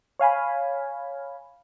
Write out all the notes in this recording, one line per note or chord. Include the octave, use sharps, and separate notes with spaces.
C#5 F5 G#5 B5